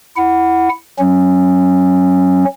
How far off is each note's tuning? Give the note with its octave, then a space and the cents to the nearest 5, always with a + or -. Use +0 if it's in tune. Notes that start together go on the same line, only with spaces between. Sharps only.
E4 +0 F#5 +0
F#3 +0 C#4 -20